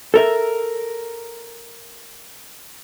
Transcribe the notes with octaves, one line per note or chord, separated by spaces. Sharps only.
A4 A#4 E5